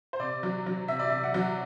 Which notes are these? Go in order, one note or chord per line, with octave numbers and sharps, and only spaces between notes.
C5
C3 D5
F#3
F#3
C3 E5
D5
C3 E5
F#5
F#3